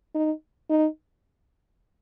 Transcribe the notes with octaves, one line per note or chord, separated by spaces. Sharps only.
D#4
D#4